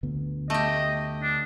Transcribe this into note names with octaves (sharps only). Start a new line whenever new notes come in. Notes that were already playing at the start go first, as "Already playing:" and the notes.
D2 D3 B3
A3 G4 D#5
D4